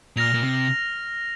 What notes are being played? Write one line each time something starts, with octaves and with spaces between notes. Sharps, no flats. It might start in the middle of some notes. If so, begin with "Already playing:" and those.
A#2 F6 A#6 F7
A#2
C3